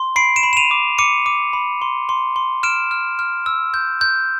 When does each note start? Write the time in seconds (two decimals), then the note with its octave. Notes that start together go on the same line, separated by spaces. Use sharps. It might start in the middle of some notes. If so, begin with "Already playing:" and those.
Already playing: C6
0.16 B5 C7 D7
0.36 D7 E7
0.43 B5
0.53 E7
0.57 D#7 F7
0.71 D6
0.99 D6 C#7 D#7
1.26 D6
1.53 B5
1.82 C6
2.09 C6
2.36 C6
2.63 F6 D7 E7
2.91 F6
3.19 F6
3.46 E6
3.74 G6
4.01 G6